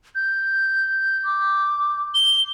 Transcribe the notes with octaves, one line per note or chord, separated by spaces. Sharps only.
G6
D6
G7